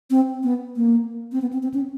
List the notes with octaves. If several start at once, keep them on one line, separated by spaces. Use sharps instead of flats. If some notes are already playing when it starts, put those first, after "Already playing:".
C4
B3
A#3
C4
B3
C4
C4
C#4